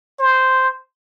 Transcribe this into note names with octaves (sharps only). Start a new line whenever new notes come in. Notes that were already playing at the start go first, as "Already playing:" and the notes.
C5